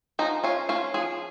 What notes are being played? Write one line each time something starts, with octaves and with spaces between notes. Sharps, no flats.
F3 D#4
C#4 F4
C#4 F4
F3 G#4